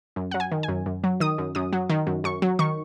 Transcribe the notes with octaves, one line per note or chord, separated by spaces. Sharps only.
F#2
F#3 F#5
G#5
D#3
G#5
F#2
F#2
F#3
D#3 D#6
F#2
F#2 D#6
F#3
D#3
F#2
F#2 C#6
F#3
D#3 C#6